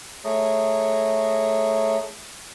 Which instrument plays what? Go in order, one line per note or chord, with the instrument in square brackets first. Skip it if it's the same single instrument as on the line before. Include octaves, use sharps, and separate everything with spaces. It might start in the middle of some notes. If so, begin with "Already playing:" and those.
[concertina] A3 G#4 C#5 A#5